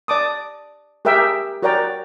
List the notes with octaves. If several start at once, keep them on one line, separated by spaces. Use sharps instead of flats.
D5 A5 D6 D#6
G4 G#4 A#4 E5 G5
F#4 A#4 C#5 D5 G5 A#5